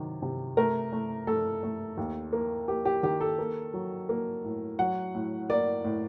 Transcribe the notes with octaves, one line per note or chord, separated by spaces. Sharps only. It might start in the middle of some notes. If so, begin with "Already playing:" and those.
Already playing: C3 D#3 F#3
C3
A3 A#4
A3
A3 A4
A3
D#2
A#3
A#3 G4
G4
D#3 G4
A4
A#3
F#3
A#3
A2
F#3 F#5
A2
A#3 D5
A2